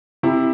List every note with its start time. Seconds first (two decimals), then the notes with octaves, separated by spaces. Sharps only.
0.23 C3 E4